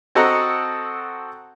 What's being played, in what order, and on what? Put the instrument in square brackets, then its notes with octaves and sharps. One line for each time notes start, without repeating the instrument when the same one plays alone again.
[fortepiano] C4 F#4 A4 D#5 F#5 A#5